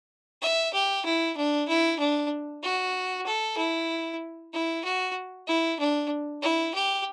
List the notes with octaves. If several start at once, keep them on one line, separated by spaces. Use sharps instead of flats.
E5
G4
E4
D4
E4
D4
F#4
A4
E4
E4
F#4
E4
D4
E4
G4